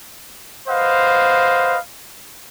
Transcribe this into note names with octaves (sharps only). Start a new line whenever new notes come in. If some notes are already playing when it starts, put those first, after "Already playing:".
B4 C5 D#5 F5 F#5